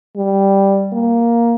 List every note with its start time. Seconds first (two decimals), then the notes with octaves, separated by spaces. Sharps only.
0.16 G3
0.93 A#3